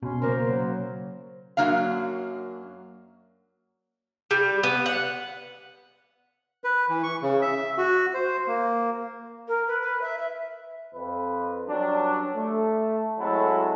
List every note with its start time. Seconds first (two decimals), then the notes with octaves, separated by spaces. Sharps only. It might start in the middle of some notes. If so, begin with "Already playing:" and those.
0.03 B2 C#4 C6
0.22 C#3 A#3 A#4 C5
0.44 F#3
1.57 F#2 D#3 F#3 A#3 D4 F5
4.31 G3
4.63 B3
4.86 F#5
6.64 B4
6.89 E3
7.03 C#6
7.22 C#3
7.42 E5
7.78 F#4
8.14 C5
8.47 A#3
9.48 A#4
9.67 B4
9.82 B4
10.01 E5
10.18 E5
10.94 F2 B4
11.68 F#3 G3 C#4 D4
12.35 A3
13.18 F#3 G#3 C4 E4 F#4 A4